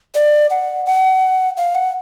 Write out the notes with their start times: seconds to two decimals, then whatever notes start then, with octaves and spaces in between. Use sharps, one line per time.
0.15 D5
0.50 F#5
0.86 F#5
1.57 F5
1.75 F#5